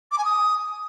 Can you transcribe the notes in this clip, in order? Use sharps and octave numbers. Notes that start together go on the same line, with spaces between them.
D6
G#5
D#6